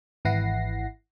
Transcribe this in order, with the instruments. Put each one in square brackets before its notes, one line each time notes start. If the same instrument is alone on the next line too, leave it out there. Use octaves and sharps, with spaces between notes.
[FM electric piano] G#1 E3 E4 F#5 A#6 C7